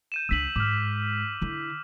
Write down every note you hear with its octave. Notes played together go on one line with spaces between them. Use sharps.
G6 D#7 E7
C#2 D4 E6 B6 F#7
G#2 D6 F6
D3 E4